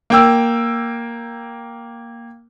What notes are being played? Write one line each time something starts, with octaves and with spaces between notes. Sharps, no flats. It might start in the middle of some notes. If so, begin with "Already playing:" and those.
A#3 G5 E6